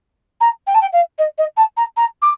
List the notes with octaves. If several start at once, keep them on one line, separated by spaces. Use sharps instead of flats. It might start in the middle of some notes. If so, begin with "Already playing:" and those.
A#5
G5
A5
G5
F5
D#5
D#5
A5
A#5
A#5
D6